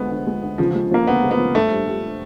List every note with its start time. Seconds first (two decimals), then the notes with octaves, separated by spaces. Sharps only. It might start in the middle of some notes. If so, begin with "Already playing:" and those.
Already playing: D2 F3 G#3 B3
0.11 D2
0.27 G#3
0.43 D2
0.58 C#3 F3
0.70 F3 G#3
0.91 F3 A#3
1.07 D2 B3
1.23 G#3
1.31 B3
1.39 F3
1.55 G2 A3
1.72 G3
1.87 G3